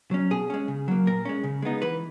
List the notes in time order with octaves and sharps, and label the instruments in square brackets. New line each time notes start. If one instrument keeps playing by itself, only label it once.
[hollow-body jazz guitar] F#3 C#4
B2 G#4
G#3 C#4
C#3
F#3 A#3
A#2 A#4
G#3 C#4
C#3
G#3 B3 D#4
E3 B4